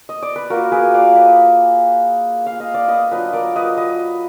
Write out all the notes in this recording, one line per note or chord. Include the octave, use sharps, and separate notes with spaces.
D#5
D5
B4
A#3 F4 F#4 A#4
G#4 B4
D5 F5
B4 D#5
F5
D#5
D5
B4 D#5
F#3 D4 F4 B4 D#5
A#4 D5
B4 D#5
B4 D#5